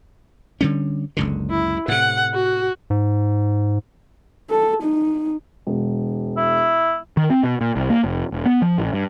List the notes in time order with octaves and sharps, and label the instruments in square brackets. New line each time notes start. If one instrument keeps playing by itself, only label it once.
[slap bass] D3 G3 C#4
F#1 C#2 D3
[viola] E4
[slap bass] A2 C3 [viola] F#5
[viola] F#4
[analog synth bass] G#2
[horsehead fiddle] A4
D#4
[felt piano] E1
[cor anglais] E4
[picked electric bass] D#3
C4
B2
A#2
C2
A#3
F1
E1
B3
F3
A1
G2